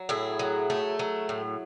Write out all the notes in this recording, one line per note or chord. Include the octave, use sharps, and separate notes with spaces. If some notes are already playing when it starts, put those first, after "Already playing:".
Already playing: F#3
A2 E4 G#4
F#3
A3
F#3
A2